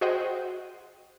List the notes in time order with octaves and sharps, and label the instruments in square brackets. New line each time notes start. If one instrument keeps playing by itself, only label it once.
[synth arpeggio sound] F#4 G#4 C5 D#5 F#5 G5